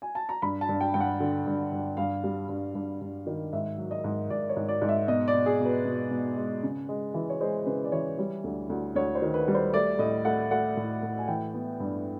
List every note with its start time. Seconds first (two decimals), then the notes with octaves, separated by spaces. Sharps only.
0.02 G#5
0.15 A5
0.29 A#5
0.42 G2 B5
0.61 A5
0.69 G2
0.81 G5
0.94 G2 G5
1.00 F#5
1.20 D3
1.46 G2
1.72 G2
1.97 G2 F5
2.24 G3
2.49 G2
2.75 G2
3.01 G2
3.27 D#3
3.53 G#2 E5
3.78 F#3
3.91 D#5
4.04 G#2
4.30 G#2 D5
4.49 C#5
4.57 G#2
4.69 D5
4.82 G#2
4.89 E5
5.08 B2 D#5
5.28 D5
5.34 B2
5.46 G#4
5.60 B2
5.66 B4
5.85 B2
6.11 B2
6.37 G#3
6.63 C#3
6.89 G#3
7.14 E3
7.30 C#5
7.41 G#3 C5
7.66 C#3 B4
7.84 D5
7.92 E3 C#5
8.18 G3 C#5
8.44 D2
8.70 D2
8.95 D2 C#5
9.15 C5
9.22 D#3
9.34 B4
9.48 G3
9.55 C5
9.74 A3 D5
9.99 A2 D#5
10.25 A3 F#5
10.51 A3 F#5
10.77 A2
11.03 A2
11.18 G#5
11.28 E3 G5
11.54 B3
11.80 G2